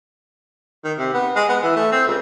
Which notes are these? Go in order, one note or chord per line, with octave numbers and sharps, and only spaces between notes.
D#3
C3
B3
G#3
B3
E3
A3
C4
C#2